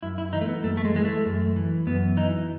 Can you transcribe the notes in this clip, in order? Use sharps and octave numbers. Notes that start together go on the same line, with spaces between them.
F#2 E4
E4
E3 D#4
A3
B3
F#2 A3
A3
G#3
E3 G#3
A3
F#2
E3
F#2 B3
E3 D#4